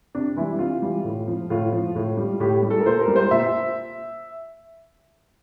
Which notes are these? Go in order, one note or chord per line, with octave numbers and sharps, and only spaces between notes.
C3 D4
E3 G3 E4
C3 F4
E3 G3
A2
F3
A2 F4
F3
A2
G3
A2 G4
G3
A4
A#4
A#2 C5
A#4
G3
C5
A#2 E5